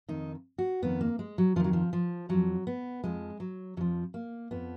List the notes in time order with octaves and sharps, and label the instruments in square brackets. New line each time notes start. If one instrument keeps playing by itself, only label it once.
[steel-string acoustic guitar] F2 D#3 D#4
F#4
F2 D#3 B3
A#3
G#3
F#3
F2 F3
D#3 F#3
F3
F3
F2 F3 F#3
B3
F2 F3 G#3
F#3
F2 F#3
F3
A#3
F2 F3 B3